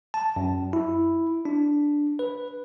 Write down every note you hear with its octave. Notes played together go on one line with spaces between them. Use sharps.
A5
F#2
E4
D4
B4